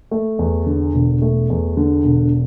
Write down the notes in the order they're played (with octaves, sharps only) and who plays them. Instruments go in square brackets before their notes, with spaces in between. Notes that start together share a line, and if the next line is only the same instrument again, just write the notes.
[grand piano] A3
E2
D3
E1
A3
E2
D3
E1